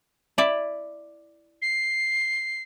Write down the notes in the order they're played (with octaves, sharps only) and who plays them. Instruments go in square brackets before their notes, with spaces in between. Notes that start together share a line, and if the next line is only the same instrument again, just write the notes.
[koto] E4 D5 E5
[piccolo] C7